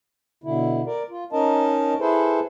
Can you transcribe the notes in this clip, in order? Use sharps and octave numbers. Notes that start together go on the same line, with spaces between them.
B2 D3 E4
A#4 D5
F4
C#4 D#4 A#4 D#5 A5
E4 G#4 A4 B4 C5